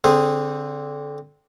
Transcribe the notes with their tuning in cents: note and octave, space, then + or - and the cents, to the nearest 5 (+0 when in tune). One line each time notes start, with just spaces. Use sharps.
D3 -25 C4 +0 G#4 -10